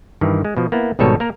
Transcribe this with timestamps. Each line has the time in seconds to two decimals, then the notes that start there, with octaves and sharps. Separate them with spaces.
0.21 G2 D#3 E3
0.45 G#3
0.57 B2 F3
0.72 A#3 B3 E4
0.99 G#1 G#2 B2 G3 A4 C#5
1.20 A#3 A#4